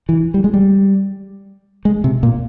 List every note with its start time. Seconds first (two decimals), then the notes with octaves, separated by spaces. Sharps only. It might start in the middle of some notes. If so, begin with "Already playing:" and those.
0.09 E3
0.34 G3
0.44 G#3
0.54 G3
1.85 G#3
2.04 C3
2.23 A#2